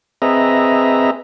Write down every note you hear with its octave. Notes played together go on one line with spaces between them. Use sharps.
C4 G#4 B4 D#5 E5 A#5